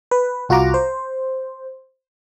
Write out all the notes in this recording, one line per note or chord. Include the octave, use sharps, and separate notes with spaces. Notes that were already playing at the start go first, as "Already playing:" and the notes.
B4
C2 F4 F#4 F#5 A#5 D6
C5